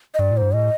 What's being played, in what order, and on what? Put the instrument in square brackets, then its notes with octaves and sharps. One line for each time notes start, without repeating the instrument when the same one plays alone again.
[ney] D#5
[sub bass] G2 [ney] D5
[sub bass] A2
[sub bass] G2 [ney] C5
[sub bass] A2 [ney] D#5